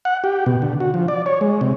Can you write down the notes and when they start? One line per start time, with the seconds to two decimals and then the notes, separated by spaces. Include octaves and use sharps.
0.05 F#5
0.24 G4
0.46 B2
0.62 D3
0.80 F#4
0.94 F3
1.08 D5
1.26 C#5
1.41 G#3
1.61 C3